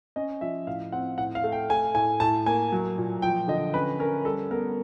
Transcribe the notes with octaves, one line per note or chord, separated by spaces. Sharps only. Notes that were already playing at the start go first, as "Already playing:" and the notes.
C#4 D#5
F3 E5
A2 F5
C4 F#5
A2 F#5
F5
A3
G5
A3 G#5
A2 G#5
A2 A5
A#3 G#5
F#3
A#2
F3 G5
D3 D#5
C#4 B4
C#4 A#4
G3 A4
B3 A#4